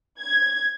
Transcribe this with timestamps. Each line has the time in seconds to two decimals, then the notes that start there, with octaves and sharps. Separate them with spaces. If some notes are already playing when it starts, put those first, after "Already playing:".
0.20 G#6